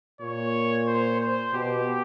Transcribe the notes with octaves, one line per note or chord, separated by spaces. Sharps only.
A#2 C#5
C5
C5
B2 G4